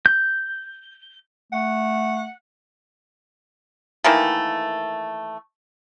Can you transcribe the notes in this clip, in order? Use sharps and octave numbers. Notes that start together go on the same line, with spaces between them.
G6
A3 F#5
D#3 E3 A3 A#3